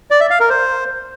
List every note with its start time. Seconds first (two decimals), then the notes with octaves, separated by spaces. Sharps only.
0.11 D5
0.21 E5
0.30 F5
0.40 A#4
0.50 C5